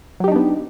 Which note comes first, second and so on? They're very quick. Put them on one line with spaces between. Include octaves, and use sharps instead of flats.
F#3 G4 D#4 D4 B3